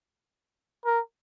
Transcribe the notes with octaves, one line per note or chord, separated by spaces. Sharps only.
A#4